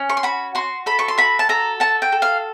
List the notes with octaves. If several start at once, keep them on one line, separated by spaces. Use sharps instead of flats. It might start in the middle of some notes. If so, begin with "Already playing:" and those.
Already playing: C#4
C#6
C6
F#4 B5
F#4 C6
A4 B5
C#6
C6
F#4 B5
A5
A4 A#5
F#4 A5
G5
A4
F5